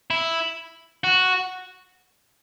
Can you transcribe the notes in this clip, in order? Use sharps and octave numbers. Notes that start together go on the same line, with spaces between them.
E4
F#4